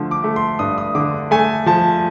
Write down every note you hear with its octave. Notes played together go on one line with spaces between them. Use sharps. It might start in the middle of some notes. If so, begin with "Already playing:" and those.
Already playing: D3 F3 A3
D6
A3
C6
G2 D#6
D#6
D3 D6
A3 G#5
F3 A5